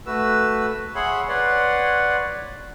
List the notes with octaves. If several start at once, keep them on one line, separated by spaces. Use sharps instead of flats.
A3 F#4 B4 E6
G#4 C#5 E5 F#5 B5 C6
B4 C#5 D5 F#5 C6